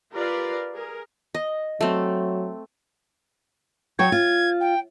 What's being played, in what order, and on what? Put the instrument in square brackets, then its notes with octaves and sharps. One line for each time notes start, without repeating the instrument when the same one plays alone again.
[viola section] F4 G4 A#4 B4 D5 F5
G#4 A#4
[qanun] D#5
[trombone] F#3 [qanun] A3 C4
[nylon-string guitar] F#3 C#5 G5 [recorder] G#6
[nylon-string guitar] F4
[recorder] G5